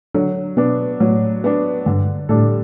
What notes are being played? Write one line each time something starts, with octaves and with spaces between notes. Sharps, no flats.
D3 F#3
B2 B3 D4
A2 F#3
B3 D4
G2 D3
A2 G3 D4 A4